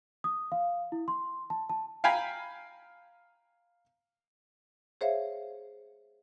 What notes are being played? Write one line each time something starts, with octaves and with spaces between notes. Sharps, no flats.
D#6
F5
E4
C6
A5
A5
F5 G5 G#5 A#5 B5
G#4 C5 C#5 E5 F5